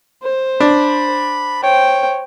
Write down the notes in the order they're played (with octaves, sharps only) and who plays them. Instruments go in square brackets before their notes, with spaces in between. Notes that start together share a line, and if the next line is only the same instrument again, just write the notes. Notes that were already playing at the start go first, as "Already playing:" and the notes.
[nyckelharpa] C5
[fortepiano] D4 [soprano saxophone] B5
[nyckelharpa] C5 G5 [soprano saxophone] C#5